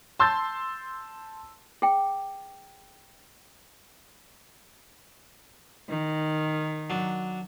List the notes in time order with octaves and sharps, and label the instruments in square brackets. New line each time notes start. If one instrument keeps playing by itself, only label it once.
[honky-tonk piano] A5 C6 E6 G6 A6
[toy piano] G#4 G5
[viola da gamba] D#3
[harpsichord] F#3 D4